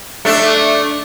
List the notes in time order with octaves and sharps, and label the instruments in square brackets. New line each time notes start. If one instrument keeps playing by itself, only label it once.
[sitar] A3 D4